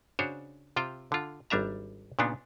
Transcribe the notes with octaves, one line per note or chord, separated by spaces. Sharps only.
C#3 D4 F#4 C5 C#5
C3 F4 C5 G5
D3 F4
G#1 G3 D4 E5 A#5
A#2 C#3 B3 D4 D#4